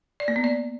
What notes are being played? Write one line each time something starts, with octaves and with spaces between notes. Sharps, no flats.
D5
A#3
B3
D5